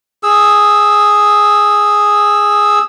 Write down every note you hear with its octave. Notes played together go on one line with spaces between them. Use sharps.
G#4 E6